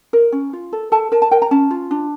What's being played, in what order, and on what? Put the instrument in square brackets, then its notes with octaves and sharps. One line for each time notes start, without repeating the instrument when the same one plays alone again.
[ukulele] A#4
C#4
F4
A4
A4 A5
A#4 A5
A5
A#4 G5
A#5
C#4 A5
F4
D4